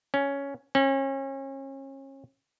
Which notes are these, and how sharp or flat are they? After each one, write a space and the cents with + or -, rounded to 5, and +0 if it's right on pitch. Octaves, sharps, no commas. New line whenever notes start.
C#4 +5
C#4 -35